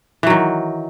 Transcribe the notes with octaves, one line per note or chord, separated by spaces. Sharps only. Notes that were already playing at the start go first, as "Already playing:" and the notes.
D#3 E3 F#3